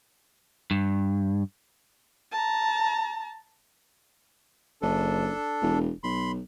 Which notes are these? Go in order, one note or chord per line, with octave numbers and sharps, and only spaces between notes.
G2
A5 A#5
F#1 D4 A4
E1
B1 B5 C6